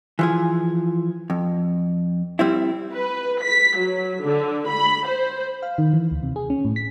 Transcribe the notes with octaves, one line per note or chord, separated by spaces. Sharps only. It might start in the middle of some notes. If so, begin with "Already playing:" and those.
E3 F3 G#4
F2
G3 C4 E4
B4
B6
F#3
D3
B5
C5
F5
D#3
E3
D2
C3
G#4
C#4
A2
B6